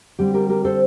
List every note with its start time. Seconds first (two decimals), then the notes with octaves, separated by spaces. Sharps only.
0.19 D3 G3 C4 G4
0.34 G4 A#4
0.49 G4 A#4
0.65 A4 C5